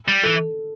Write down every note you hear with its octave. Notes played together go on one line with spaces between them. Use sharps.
G3
E3 A4